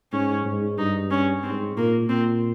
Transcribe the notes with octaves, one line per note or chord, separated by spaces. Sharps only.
G#2 C#4
G#2
G2 D#4
C#4
G#2 C4
A#2 A#3
A#2 C4